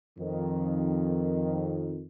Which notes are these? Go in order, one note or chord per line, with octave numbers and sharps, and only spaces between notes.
F2 D#3